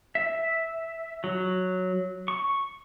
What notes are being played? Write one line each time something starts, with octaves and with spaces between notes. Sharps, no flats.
E5
F#3
C#6